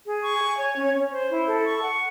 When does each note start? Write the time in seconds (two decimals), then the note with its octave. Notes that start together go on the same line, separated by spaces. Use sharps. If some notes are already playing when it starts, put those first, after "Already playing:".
0.05 G#4
0.23 C#6
0.41 G#5
0.58 C#5
0.75 C#4
0.94 C#4
1.12 C5
1.30 E4
1.47 A4
1.65 C#6
1.83 F#5